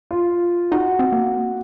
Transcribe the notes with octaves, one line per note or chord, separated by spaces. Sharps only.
F4
D#4 F#4
C4
A#3